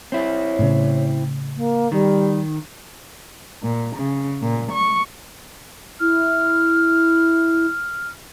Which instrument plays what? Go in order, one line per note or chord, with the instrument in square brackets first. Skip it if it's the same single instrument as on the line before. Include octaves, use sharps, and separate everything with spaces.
[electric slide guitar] C4 E4 [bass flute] C#5
[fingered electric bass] A2 C#3
[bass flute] A#3
[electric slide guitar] D#3 [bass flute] G3
[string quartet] A#2
C#3
A#2
C#6
[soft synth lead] E4 [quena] F6